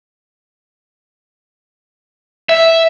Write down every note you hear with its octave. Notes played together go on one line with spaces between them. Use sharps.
E5